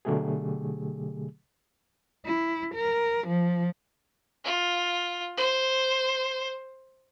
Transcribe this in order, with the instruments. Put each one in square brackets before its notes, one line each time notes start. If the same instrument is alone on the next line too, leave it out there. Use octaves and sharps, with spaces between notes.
[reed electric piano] B2 D3 F#3 A3 G4 G#4
[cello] E4
A#4
F3
[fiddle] F4
C5